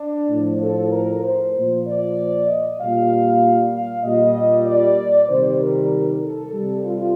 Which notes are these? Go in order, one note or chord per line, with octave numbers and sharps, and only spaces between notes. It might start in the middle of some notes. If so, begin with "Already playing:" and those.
Already playing: D4
A2 F3
A4
A#4
C5
A#2 F3
D5
D#5
A#2 G3 F5
F5
A#2 G3 D#5
D5
C3 D#3 G3 C5
A#4
A4
C3 G3
F4